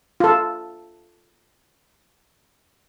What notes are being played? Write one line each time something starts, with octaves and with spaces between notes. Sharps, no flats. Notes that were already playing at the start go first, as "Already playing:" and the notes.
F4 A4